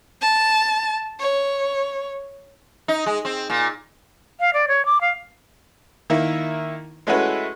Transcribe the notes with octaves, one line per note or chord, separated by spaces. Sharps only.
A5
C#5
D#4
G#3
C4
A#2
F5
D5
C#5
D6
F5
D#3 A#3 E4
G#3 A3 C#4 E4 F#4 B4